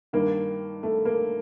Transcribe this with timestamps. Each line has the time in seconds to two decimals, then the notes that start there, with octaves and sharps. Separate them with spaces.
0.13 G2 D#3 A#3
0.83 A3
1.05 A#3